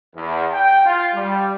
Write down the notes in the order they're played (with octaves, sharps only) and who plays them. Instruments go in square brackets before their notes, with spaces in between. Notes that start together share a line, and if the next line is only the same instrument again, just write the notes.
[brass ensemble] E2
G5
F4
G3